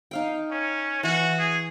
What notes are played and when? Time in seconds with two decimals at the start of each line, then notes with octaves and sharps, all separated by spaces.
0.11 D#4 F5 G5
0.51 C#4
1.03 E3 F#4
1.39 G#4